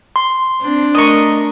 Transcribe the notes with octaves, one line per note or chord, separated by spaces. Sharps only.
C6
C4 D4
A3 A#4 D#5 C#6